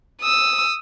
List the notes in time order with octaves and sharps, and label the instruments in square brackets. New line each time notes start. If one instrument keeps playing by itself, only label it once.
[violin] D#6 E6